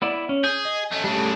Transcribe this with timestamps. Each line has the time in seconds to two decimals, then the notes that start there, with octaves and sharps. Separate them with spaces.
0.02 B3 E4 D5
0.29 C#4
0.44 G#4 G6
0.65 D#5
0.91 A3 C#4
1.04 C#3 G3 A3 D4